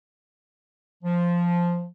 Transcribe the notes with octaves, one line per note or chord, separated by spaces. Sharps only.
F3